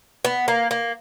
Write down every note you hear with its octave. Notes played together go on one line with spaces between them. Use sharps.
B3
A#3
A#3